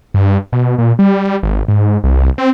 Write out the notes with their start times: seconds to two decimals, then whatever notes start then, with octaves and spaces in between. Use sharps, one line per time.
0.14 G2
0.53 B2
0.78 A#2
0.99 G3
1.43 G#1
1.68 G#2
2.04 C2
2.38 C4